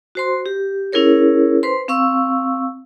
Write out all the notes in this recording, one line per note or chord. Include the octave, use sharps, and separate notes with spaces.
F#4 C5 C6
G4
C#4 E4 G#4 A#4 C#5
B4 C5 C6
C4 F5 C#6 E6